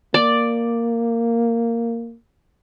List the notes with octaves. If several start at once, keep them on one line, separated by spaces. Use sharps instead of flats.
A#3 D5